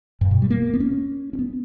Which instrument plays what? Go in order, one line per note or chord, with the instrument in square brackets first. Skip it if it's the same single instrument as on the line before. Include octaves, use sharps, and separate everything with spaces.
[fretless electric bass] G2
B2
G3
A#3
B3
C#4
C#4
B3